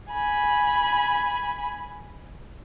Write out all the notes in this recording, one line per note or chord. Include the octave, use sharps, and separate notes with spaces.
G#5 B5